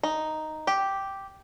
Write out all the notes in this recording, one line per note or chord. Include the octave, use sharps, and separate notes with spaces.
D#4
G4